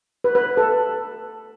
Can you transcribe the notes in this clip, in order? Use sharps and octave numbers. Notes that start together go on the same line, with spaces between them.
B4
B4
A4